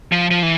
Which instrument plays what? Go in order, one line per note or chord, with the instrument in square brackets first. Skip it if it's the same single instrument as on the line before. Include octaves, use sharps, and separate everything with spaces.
[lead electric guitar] F3
F3
E3